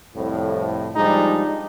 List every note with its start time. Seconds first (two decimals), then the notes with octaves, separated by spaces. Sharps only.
0.15 C2 F2 A2
0.96 F3 G3 G#3 D4 D#4